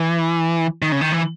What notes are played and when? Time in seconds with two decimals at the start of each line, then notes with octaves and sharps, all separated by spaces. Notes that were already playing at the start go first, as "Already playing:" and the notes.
Already playing: E3
0.82 D#3
0.92 C#3
1.01 D#3
1.12 E3